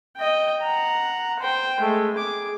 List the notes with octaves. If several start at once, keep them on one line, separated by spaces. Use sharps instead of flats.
D#5 G5
F#5 A#5
C5 G5
G#3 A3
G#4 D6